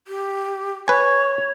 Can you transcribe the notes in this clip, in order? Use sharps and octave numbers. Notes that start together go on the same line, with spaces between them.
G4
B4 C#5 G#5 C#6